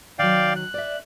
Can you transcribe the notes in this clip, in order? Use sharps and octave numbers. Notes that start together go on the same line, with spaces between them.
D#3 F#3 D5 F5 G5
F#6
D5 E5